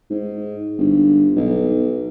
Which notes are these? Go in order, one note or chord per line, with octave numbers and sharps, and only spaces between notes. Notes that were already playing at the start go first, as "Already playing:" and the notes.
G#2
G1
B1